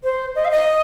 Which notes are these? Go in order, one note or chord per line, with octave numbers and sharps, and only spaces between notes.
C5
D#5
F5
D#5